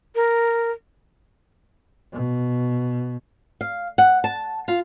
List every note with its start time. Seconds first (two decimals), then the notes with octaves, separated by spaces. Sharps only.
0.15 A#4
2.13 B2
3.61 F5
3.98 F#5
4.24 A5
4.68 F4